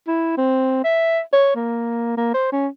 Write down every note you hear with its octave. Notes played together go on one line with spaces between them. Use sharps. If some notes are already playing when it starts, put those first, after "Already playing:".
E4
C4
E5
C#5
A#3
A#3
C5
C#4